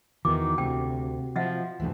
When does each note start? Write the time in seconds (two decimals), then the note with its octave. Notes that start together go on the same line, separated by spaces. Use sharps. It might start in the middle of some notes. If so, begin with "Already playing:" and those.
0.25 E2 D#3 E3 F#4 D6
0.58 D2 C3 G5
1.36 F3 D#5 E5 F#5
1.80 D2 G2 C3 E3